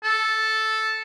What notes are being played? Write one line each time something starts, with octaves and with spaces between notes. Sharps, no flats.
A4